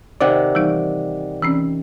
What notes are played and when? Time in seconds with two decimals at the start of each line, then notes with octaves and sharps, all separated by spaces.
0.21 C3 D#3 D5 F#5
0.55 E3 G3 D#4
1.42 E3 C4 C#4